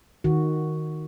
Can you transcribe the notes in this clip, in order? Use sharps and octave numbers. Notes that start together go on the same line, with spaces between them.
D#3 F#4